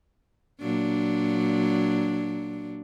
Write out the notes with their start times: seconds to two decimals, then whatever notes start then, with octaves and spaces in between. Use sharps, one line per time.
0.61 A#2 F#3 D4